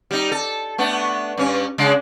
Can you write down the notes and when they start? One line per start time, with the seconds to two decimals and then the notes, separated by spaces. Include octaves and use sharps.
0.11 G3 D#4
0.32 A4
0.78 A3 B3 D4
1.38 G2 C#4
1.78 C#3 G#3 D4